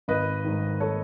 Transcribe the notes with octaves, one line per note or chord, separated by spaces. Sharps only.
G#1 B4 D#5
G#2 D#3
A4 C#5